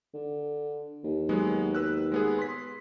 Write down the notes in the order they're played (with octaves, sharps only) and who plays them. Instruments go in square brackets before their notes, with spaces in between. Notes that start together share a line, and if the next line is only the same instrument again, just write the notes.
[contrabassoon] D3
D#2
[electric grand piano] F#3 G#3 B3
B4 E6 F#6
G#3 B3 G#4
C6 B6